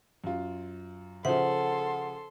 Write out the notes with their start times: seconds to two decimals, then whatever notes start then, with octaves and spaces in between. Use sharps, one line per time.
0.24 F#2 F4
1.25 C#3 F3 A4 C5 E5 F#5 C6